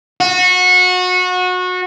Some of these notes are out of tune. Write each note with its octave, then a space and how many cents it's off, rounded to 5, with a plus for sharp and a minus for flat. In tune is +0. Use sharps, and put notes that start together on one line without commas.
F#4 -25